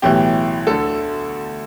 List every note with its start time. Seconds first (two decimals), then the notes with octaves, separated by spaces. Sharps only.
0.02 B1 A2 E3 G4
0.67 D2 D3 A4